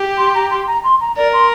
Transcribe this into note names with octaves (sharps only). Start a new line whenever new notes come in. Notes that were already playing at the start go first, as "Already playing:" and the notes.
Already playing: G4
C6
A#5
C6
A#5
C6
A#5
A#4 D5
C6